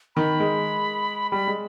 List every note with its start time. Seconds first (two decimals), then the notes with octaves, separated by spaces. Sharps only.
0.16 D#3 B5
0.40 G#3
1.32 G3 B5
1.47 G#3